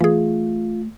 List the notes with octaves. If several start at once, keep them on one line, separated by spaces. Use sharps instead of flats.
E3 A3 F4 G#4